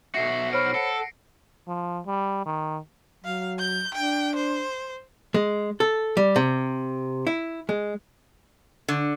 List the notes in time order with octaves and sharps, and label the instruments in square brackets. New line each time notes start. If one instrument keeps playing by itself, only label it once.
[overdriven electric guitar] B1 F#4 [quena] E5 [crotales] A#6 C7 C#7
[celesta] C5 C#5 B5 [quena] F6 [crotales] D7
[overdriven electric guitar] A4 [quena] F#5
[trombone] F3
G3
D#3
[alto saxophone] F#3 [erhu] F5
[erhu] G6
[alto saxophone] D4 [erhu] G5
[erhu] C5
[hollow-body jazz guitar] G#3
A4
G3
C3
E4
G#3
[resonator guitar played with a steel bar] D3